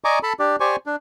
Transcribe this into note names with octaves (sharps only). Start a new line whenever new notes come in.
D5 D#5 G#5 A#5 C#6 D6
A4 A5 B5
D4 G4 D5
G4 C5 D5 G#5 C#6
D4